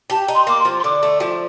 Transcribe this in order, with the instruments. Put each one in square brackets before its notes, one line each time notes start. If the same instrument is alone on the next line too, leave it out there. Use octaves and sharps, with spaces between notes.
[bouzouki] G4 [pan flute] A5
[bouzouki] D#4
[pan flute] C6
[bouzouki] A#3 [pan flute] D6
[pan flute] C6
[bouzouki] F3
[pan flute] C6
[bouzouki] D3 [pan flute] D6
[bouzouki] A3
F3